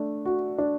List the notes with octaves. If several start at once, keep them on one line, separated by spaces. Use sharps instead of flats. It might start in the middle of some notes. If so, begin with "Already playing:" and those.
Already playing: A3 D4
F#4
D4